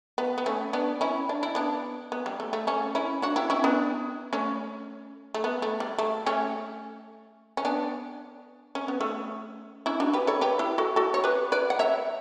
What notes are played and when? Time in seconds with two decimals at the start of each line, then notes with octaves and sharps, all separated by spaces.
0.18 B3
0.38 B3
0.46 A3 C#4
0.73 B3 D4
1.01 C#4 E4
1.29 D4
1.43 E4
1.55 B3 D4
2.12 B3
2.26 G3
2.40 A3
2.53 A3
2.67 A3 C#4
2.95 C#4 E4
3.22 D4 F#4
3.36 E4 G4
3.50 C#4 E4
3.64 B3 D4
4.33 A3 C#4
5.34 A3
5.44 B3
5.62 A3
5.80 G3
5.98 A3
6.26 A3 C#4
7.57 C#4
7.65 B3 D4
8.75 C#4
8.88 B3
9.01 A3 C#4
9.86 C#4 E4
10.00 D4 F#4
10.13 G4 B4
10.27 A4 C#5
10.41 G4 B4
10.59 E4 G4
10.78 F#4 A4
10.96 F#4 A4
11.14 C#5
11.24 G4 B4
11.52 B4 D5
11.70 F#5
11.79 C#5 E5